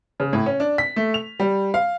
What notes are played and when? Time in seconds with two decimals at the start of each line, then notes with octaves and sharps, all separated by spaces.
0.20 C#3
0.33 A2
0.46 C#4
0.60 D4
0.78 B6
0.96 A3
1.14 F7
1.40 G3
1.74 F5